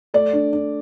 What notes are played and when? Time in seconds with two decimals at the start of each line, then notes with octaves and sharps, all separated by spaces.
0.14 A3 D5
0.33 D4
0.53 D4